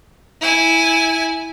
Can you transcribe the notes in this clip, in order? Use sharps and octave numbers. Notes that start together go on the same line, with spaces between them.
E4 G#5